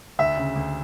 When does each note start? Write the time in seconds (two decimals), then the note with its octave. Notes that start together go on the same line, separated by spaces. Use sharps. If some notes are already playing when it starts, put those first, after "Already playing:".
0.19 D2 E5
0.37 C#3
0.56 D2